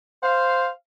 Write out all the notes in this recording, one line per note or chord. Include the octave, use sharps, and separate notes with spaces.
C5 F5